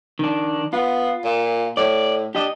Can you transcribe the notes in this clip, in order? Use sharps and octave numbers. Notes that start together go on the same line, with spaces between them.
D#3 D4
B3 F4
A#2
A2 D5
D4 G4 D#5